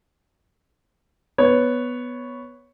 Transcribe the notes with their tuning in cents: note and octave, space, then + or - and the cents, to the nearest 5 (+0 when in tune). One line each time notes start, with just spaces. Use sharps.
B3 +0 C#5 +0